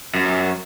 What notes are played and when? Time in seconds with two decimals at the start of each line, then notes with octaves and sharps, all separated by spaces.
0.15 F#2